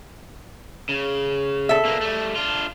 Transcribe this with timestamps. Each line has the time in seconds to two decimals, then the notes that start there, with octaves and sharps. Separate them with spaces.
0.89 C#3
1.69 A4 E5
1.85 B2 A#3
2.01 G3 A3
2.36 D4 F4